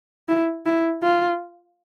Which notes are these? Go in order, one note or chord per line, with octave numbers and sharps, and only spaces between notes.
E4
E4
F4